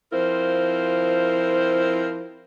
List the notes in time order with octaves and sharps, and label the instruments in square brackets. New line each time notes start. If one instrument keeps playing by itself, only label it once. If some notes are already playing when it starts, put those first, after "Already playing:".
[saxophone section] F3 C4 E4 F4 A#4 C5